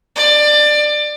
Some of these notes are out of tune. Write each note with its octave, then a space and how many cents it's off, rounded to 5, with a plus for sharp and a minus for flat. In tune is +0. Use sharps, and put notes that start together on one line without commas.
D5 +20